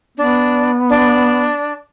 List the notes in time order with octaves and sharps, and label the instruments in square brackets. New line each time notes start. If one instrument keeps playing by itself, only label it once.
[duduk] B3 [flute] D4
[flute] D4